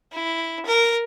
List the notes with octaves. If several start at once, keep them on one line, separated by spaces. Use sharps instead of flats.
E4
A#4